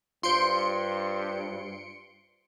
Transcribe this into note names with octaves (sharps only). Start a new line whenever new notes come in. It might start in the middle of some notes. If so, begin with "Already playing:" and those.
G2 F4 C5 C6 C#7 D7